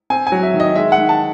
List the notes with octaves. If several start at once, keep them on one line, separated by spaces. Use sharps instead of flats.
C4 G#5
G#5
F#3
E5
D#3
D#5
G#3 E5
F#5
D#3
A5